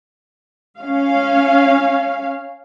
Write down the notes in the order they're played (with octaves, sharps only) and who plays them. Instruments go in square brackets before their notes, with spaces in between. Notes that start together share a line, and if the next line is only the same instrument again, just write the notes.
[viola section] C#4 F5